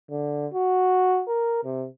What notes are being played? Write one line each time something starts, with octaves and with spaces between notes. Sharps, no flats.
D3
F#4
A#4
C3